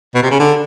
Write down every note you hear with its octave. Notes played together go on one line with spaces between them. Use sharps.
B2
C3
C#3
D3